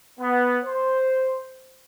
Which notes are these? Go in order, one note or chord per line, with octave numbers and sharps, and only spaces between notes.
B3
C5